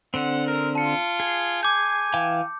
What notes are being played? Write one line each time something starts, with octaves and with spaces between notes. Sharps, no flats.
D3 C4 F#5
A#4
F4 A5 C#7
G#4
G#5 D6 G6
E3 F5 G5